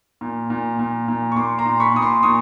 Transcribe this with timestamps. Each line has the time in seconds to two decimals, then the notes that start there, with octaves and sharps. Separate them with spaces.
0.21 A#2
0.50 A#2
0.79 A#2
1.08 A#2
1.32 C#6
1.36 A#2 C6 D6
1.58 A#5 C6
1.66 A#2
1.80 B5 C#6
1.94 A#2 D#6
2.01 C6 D6
2.23 A#2 C#6 D#6